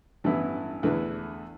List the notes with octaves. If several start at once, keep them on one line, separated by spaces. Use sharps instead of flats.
A1 G2 E3 B3 E4
E2 D3 A3 E4 B4